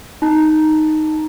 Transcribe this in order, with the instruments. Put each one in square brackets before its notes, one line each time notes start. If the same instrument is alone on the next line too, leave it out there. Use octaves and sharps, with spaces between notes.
[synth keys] D#4 A5 A#5